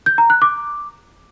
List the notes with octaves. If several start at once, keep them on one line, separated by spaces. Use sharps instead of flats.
G6
A#5
F#6
D6